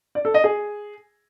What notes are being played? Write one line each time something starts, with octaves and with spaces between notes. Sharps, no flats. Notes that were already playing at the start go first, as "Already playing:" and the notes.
D5
A4
D#5
G#4